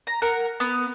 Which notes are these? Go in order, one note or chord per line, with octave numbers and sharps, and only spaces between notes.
A#5
A#4 F#5
B3